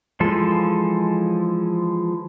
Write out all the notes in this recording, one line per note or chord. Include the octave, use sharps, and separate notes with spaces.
E3 F3 G#3 A4